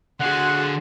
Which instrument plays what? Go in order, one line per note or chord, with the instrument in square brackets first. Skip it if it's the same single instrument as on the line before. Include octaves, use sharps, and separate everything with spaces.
[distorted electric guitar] D3 F5 [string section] F#4 G#4 C6 [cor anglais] F#5